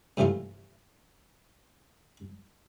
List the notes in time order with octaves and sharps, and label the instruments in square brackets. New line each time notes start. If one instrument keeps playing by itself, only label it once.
[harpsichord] G2 C3 E3 A3 F4